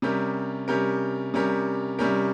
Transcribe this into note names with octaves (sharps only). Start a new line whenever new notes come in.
C3 G3 C#4 G4 A#4
C3 G3 C#4 G4 A#4
C3 G3 C#4 G4 A#4
C3 G3 C#4 G4 A#4